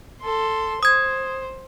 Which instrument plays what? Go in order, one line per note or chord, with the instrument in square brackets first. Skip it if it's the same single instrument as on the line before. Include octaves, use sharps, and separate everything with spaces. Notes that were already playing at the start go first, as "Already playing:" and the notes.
[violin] A4 C6
[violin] C5 [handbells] D#6 G#6